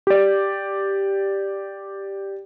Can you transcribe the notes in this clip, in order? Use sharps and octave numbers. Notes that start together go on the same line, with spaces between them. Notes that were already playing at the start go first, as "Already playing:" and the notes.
G4 D5